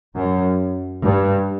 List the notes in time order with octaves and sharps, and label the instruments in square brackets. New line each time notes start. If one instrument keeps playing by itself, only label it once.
[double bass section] F#2
G2